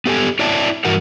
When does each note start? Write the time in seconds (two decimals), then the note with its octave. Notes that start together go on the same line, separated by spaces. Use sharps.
0.06 B3 G4 A4 G#5
0.39 E4 C#5 D5 E5 G5 A5
0.85 G2 E3 F#4 A#4 F#5